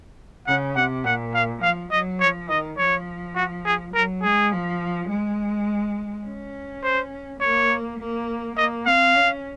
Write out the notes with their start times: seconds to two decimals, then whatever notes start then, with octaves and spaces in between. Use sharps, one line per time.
0.47 C#3 F#5
0.76 C3 F#5
1.04 A#2 F#5
1.34 F5
1.62 F3 F5
1.91 F#3 D#5
2.20 F3 C#5
2.49 D#3 D#5
2.78 F3 C#5
3.36 F#4
3.66 G#4
3.94 F#3 A#4
4.23 G#3 G#4
4.52 F3
5.09 G#3
6.26 C#4
6.83 C5
7.41 A#3 C#5
7.99 A#3
8.56 A#3 D#5
8.86 C4 F5
9.14 C#4